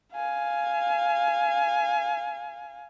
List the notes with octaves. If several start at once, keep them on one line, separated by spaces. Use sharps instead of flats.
F5 G#5